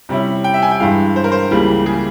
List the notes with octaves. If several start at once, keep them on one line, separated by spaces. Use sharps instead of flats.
C3 G3 C#4 E4
G5
E5
G#5
G5
G2 E3 G#3 F5
C5
A#4
C5
C#2 C#3 E3 G3 A#3
G#4